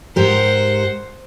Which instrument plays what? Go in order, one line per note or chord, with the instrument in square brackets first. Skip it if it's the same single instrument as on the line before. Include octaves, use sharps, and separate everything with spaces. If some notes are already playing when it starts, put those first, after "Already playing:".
[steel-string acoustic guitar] G#2 G4 A#4 [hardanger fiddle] C5 F#5